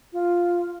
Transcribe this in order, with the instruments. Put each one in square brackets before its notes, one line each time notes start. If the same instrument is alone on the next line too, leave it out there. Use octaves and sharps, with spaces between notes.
[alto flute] F4